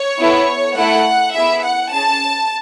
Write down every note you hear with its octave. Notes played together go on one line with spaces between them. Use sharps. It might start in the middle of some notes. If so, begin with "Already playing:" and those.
Already playing: C#5
B3 E4 A4
A3 E4 A4 F#5
B3 E4 G#4 E5
F#5
C#4 G#4 A5